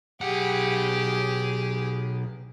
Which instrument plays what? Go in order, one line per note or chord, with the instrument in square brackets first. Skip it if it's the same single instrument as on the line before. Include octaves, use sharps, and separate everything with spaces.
[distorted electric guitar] B1 F#5 [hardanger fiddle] G4 G#4